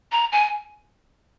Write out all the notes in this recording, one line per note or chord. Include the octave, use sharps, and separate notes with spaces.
A#5
G#5